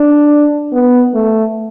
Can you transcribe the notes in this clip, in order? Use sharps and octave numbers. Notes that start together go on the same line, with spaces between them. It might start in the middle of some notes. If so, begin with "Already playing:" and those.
Already playing: D4
B3
A3